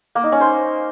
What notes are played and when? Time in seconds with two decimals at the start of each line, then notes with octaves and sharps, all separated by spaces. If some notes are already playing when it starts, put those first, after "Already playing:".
0.15 A#3
0.24 D#4
0.32 C#4
0.40 C5